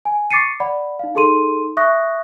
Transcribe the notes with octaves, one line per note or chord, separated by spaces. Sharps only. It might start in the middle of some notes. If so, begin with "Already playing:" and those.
G#5
C#6 D6 A6 C7 C#7 D#7
D5 F#5 B5
D#4 F5
D#4 G#4 A4 C6 D#7
E5 C#6 D#6 F#6 A#6